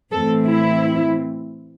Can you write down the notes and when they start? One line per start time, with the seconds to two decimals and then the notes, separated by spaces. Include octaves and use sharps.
0.11 A2 E3 A3 C4 A4
0.47 E4